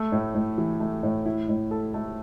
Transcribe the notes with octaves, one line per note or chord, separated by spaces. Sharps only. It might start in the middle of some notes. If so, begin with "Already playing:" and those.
Already playing: A3
A2
A2
E3
A3
A2
E4
A2
A4
A3